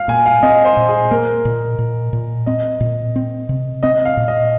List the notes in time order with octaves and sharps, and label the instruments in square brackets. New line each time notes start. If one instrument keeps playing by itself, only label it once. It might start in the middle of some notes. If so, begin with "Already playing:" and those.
Already playing: [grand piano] F5
[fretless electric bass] A#2 [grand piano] G#5
[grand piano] F5
[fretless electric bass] C4 [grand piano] D#5
[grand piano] C5
[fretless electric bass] A#2
[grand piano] G#4
[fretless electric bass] A#3 [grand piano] A#4
[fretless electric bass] A#2
A#2
A#2
[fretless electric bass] C4 [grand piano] D#5
[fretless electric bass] A#2
C4
C3
[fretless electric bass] C4 [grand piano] D#5
[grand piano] F5
[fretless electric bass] A#2
[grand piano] D#5